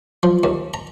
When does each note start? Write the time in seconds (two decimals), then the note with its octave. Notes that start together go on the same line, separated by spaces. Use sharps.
0.23 F3
0.44 D#2
0.74 A#5